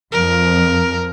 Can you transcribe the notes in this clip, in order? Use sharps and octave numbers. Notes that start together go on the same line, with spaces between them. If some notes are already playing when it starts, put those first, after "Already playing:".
F2 F3 A#4